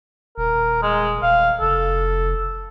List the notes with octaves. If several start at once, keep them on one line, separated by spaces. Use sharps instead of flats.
D#1 A#4
G#3
D#1 F5
F1 A4